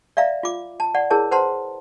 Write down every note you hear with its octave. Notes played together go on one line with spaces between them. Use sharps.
D5 E5 F5 A#5
F4 D6
A5
D5 F#5
E4 G#4 A#4 C#5 A5
B4 C5 F#5 A5 A#5 C6